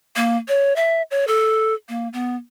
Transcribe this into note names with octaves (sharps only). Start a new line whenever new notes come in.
A#3
C#5
E5
C#5
A4
A#3
B3